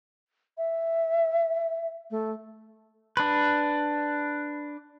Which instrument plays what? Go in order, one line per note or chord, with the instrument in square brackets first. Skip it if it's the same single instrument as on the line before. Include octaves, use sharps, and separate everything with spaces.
[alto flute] E5
A3
[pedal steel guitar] D4 B4